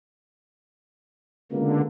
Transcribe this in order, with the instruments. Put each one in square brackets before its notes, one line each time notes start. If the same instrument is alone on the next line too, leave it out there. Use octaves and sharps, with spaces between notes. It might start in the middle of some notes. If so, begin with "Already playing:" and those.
[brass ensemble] C#2 B2 A#3 [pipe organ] D3